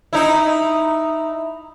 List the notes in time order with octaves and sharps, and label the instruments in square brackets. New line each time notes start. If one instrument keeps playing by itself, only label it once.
[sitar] D#4 E4